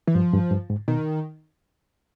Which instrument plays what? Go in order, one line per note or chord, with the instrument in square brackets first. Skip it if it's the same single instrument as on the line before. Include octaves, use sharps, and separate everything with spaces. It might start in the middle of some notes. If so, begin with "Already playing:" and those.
[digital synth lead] E3
[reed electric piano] G2 [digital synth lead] F3
[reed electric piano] G2
G2
G#2
[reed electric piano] B2 [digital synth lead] D#3